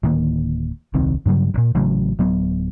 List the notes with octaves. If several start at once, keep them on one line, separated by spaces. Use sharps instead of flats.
D1 D#3 A#3
D#1 C2 D#3 C4
G2 C#3 F#3 G3
A1 A#2
A1 C#3 F#3 A3
D1 F#3 B3